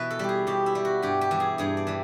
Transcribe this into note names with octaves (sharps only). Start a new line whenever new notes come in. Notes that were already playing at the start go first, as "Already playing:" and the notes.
Already playing: B2 E3 B4
A4
G3 G4
G#4
B2 G4
E4
G3
F#4
G2 G4
G4
E3 G3
G#4
G2 G#4
D5
E3 G3